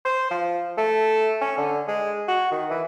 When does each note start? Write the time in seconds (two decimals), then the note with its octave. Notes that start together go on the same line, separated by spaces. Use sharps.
0.05 C5
0.31 F3
0.77 A3
1.41 C#4
1.57 D3
1.88 G#3
2.28 F#4
2.51 D#3
2.70 E3